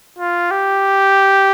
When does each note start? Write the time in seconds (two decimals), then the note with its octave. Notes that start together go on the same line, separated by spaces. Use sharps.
0.19 F4
0.51 G4